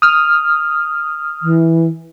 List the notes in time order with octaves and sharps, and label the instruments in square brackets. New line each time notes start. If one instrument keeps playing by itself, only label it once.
[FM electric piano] D#6 F6
[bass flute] E3